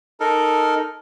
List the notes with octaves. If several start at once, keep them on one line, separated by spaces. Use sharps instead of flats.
D#4 A4 A#4